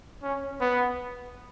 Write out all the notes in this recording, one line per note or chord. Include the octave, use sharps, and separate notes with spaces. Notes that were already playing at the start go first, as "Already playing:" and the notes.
C#4
B3